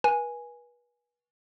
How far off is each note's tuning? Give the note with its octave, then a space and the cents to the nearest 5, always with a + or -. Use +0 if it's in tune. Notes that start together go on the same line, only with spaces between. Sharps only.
B4 -35 G#5 +0